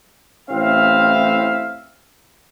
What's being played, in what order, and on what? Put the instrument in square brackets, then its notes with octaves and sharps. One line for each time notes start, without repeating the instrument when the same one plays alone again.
[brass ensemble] A1 A2 C4 E5 F5